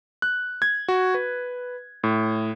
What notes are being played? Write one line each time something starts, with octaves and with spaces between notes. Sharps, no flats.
F#6
G#6
F#4
B4
A2